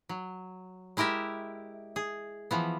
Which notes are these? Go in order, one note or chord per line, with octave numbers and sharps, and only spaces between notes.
F#3
G#3 E4 G4 A#4 E5
G#4
E3 F3 B3